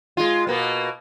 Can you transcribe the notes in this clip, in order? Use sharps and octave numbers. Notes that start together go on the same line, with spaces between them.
G#3 F4
B2 A#3 B3